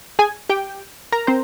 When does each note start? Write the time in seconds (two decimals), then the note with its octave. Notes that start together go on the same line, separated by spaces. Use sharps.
0.19 G#4 G#5
0.49 G4 G5
1.12 A#4 A#5
1.27 C4 C5